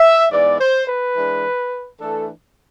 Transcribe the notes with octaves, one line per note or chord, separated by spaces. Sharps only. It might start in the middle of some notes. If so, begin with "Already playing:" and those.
Already playing: E5
G#2 E3 B3 D5
C5
B4
E3 G#3 D4
E3 A3 D4 A4